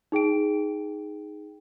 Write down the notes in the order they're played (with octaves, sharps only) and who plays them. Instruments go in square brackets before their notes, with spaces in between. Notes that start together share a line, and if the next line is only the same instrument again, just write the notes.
[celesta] D#4 G#4 G5 D7